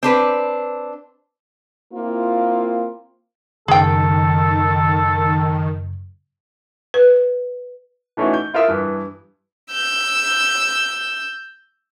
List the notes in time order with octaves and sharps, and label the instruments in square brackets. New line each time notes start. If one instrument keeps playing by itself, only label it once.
[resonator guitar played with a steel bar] C4 D4 B4
[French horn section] A#3 C4 E4 F4
[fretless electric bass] F#1 [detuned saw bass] D#3 [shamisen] G#4 G5 [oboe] A4
[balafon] B4
[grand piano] E3 A3 C#4 D#4 E4 F#4
G6
E4 F4 A#4 E5 D#6
G2 E3
[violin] E6 G6